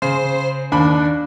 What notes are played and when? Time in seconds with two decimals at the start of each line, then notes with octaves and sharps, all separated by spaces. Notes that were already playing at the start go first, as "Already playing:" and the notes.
0.02 C#3 C5
0.72 D#2 D4 B5